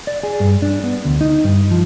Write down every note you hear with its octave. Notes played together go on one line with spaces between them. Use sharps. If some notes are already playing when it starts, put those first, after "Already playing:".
D5
G#4
G2
D4
B3
D2
D#4
G2
F3